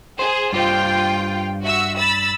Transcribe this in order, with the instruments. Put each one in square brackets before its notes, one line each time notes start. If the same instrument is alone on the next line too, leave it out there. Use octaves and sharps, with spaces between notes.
[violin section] G#4 [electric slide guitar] C5
[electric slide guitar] G2 G4 C5 [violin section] F4 G5
[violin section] F#4 E5 E6
B5 E6 A6